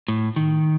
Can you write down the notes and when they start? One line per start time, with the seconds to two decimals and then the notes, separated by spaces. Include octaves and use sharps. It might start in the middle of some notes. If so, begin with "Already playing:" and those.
0.08 A2
0.36 D#3